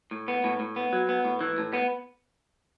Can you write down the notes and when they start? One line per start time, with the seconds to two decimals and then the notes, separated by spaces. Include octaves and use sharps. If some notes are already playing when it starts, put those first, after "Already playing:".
0.11 A2
0.28 B3
0.44 A2
0.60 A2
0.76 B3
0.93 F#3
1.09 B3
1.25 A2
1.41 E3
1.58 A2
1.73 B3